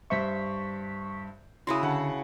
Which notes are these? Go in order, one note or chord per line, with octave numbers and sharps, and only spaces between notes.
G2 C5 E5 C#6 B6
C#3 E4 F#4 C6 D#6
D3 F#5 A5